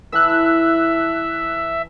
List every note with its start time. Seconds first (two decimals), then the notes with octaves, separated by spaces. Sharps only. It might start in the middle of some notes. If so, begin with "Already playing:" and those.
0.12 E3 B4 E5 A5 E6 F#6